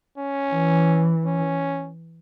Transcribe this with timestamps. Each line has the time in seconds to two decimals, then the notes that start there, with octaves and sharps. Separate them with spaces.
0.18 C#4
0.53 E3
1.25 C#4